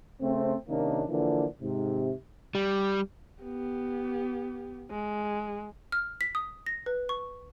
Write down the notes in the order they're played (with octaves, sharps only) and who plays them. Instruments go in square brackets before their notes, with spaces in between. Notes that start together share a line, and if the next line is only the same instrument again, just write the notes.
[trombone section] C#3 A3 C4
C3 D#3 A#3 C#4 D4
D3 E3 F3 A#3 D4
G#2 C3
[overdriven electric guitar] G3
[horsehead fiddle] B3 G4
G#3
[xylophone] F6
B6
D#6
A#6
B4
C#6